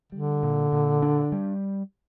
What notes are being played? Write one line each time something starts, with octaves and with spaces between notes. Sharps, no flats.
D3 G3
A#2
A#2
D4
G3